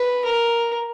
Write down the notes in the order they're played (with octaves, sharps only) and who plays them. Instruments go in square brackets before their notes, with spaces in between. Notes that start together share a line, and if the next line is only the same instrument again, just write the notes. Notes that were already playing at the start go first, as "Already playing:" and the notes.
Already playing: [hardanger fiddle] B4
A#4